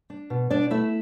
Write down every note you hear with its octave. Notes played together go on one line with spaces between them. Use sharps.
D4
B2
B2 D4 D5
A3 E4 E5